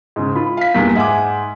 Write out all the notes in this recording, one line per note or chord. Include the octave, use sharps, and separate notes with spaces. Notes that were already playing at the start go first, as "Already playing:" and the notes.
G#2 C#3
F4 B5
F5 B6
E2 G2 A#2 B6
G#2 E5 F#5 G#5 D6